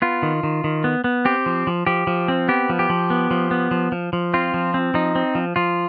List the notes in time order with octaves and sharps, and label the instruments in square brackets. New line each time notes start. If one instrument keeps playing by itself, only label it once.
[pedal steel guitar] B3 F4
D#3
D#3
D#3
B3
B3
C4 G4
F3
F3
F3 G4
F3
C4
B3 G4
F3
G4
F3
B3
F3
B3
F3
F3
F3
C4 F4
F3
C4
F3 D#4
C4
F3
F3 F4